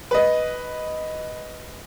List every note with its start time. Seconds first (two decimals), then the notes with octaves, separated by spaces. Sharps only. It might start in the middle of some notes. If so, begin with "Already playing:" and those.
0.11 B4 D#5